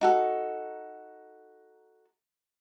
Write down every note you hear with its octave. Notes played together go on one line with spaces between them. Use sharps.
D#4 F#4 A4